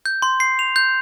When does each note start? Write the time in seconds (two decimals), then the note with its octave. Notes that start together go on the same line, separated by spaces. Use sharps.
0.06 G6
0.22 C6
0.40 C7
0.59 F7
0.76 G6